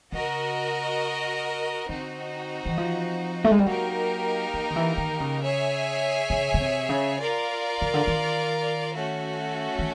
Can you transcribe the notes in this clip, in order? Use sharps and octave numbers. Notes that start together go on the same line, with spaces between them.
C#3 F#4 A#4 D#5
D3 C4 D#4 F#4
E3
F3
A3
G#3
G3
F#3 A#3 D#4 G4 A#4
F3
D#3
E3
D#3
C#3
G#4 C#5 E5 G#5
C#3
C#3
C3
C#3
F4 A#4 D5
C#3
D3
D#3
A3 C#4 F#4
D#3